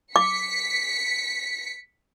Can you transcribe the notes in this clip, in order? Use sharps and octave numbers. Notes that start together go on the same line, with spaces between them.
D6 B6 C#7